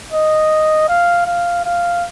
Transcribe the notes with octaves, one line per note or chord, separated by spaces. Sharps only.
D#5
F5
F5
F5